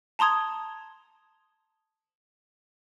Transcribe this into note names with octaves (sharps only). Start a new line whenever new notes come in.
A5 A#5 C6 D#6 G#6